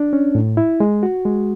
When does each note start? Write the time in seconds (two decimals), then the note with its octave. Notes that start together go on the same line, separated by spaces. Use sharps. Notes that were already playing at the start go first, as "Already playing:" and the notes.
Already playing: D4
0.13 C#4
0.35 A2
0.57 E4
0.80 G#3
1.03 F#4
1.25 G#3